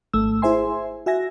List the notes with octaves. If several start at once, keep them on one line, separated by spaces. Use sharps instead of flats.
G#1 A3 E6
E4 G#4 C5 E5 G#5 C6
F#4 E5 G#5 A#6